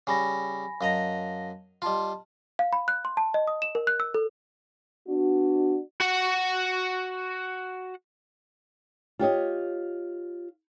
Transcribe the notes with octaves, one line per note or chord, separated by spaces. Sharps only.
C#3 G3 G#5 B5 A#6
F#2 D#5 F5 A5 A#5 A#6
G3 F4 D#5 A5 C6
F5
B5
F#6
C6
A5
D#5
D#6
E7
A#4
F#6
E6
A4
B3 D4 F#4
F#4 F#5
F4 G4 C#5 D#5